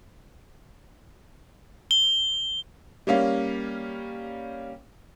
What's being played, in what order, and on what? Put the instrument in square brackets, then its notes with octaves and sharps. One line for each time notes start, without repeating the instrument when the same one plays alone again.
[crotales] G7
[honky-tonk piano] G3 A#3 C#4 F5